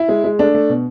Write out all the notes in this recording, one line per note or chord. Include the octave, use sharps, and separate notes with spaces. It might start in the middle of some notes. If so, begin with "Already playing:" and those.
Already playing: E4
G#3
G#3
A3 D4
A3
B2